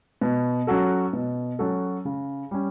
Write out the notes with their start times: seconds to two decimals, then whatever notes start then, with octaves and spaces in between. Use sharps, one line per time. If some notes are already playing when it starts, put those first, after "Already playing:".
0.21 B2
0.67 F#3 C#4 F#4 A4
1.13 B2
1.59 F#3 C#4 F#4 A4
2.05 C#3
2.51 G3 C#4